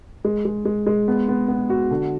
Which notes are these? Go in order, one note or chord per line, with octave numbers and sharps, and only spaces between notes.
G#3
G#3
G#3
G#3
B3
B3
B3
F#4
D3